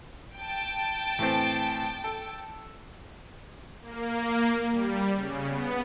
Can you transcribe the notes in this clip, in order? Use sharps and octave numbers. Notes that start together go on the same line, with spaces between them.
G5 A5
A2 E3 C4
A4
A#3
G3
C#3
B3